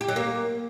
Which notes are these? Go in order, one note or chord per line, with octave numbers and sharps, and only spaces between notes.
G4
F#3
A#3